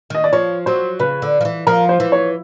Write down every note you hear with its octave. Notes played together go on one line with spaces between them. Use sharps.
D#3 D#5
D5
F3 C#5
F#3 C5
C#3 B4
D3
F3
E3
F3 A#4
C5
E3
C#5